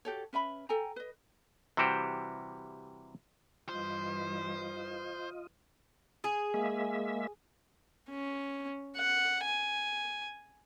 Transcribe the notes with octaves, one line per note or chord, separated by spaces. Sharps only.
F#4 G4 A4 C#5
C#4 B4 E5 B5
A4 G5 G#5 A#5
B4 D#5
C3 E3 G3 F#4 G4 C5
G2 E3 G3 F4 C5 D#5
G#4
G#3 A#3 E5
C#4
F#5
G#5